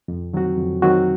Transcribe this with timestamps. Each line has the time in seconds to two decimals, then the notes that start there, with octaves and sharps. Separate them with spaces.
0.08 F2
0.33 D#3 F#3 C4 F#4
0.58 F2
0.82 D#3 F#3 C4 F#4